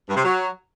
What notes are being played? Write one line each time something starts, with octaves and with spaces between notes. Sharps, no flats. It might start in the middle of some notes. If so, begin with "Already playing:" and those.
G2
C3
F#3